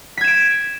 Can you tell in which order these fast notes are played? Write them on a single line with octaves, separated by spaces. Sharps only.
B6 G#6 E7 D7